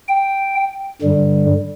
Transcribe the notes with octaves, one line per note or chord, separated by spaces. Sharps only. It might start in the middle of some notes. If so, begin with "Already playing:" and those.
G5
G2 D3 G3